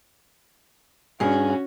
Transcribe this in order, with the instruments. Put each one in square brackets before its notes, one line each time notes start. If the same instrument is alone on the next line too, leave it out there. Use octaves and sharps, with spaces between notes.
[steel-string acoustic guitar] G2 G#4 [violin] C#4 F#4